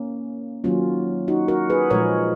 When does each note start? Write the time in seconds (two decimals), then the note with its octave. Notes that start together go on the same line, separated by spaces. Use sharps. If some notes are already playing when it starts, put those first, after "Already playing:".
Already playing: A#3 C#4
0.64 D#3 F#3 A#3 C#4 F4
1.28 D#4 F#4
1.48 F#4 A#4
1.70 G#4 B4
1.90 A#2 F3 G#3 A#4 C#5